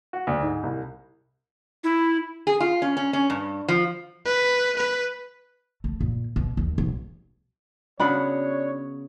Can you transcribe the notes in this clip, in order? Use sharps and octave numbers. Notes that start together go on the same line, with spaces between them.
F#4
D2
G#2
C2
E4
G#4
F4
C#4
C#4
C#4
G2
F3
B4
B4
A3
A#2
B2
D#2
B1
C#3 B3 D4 F#4 C#5 B5